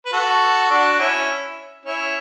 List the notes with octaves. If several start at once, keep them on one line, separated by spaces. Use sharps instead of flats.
B4
F#4 A4
D4 F#4
C#4 E4
C#4 E4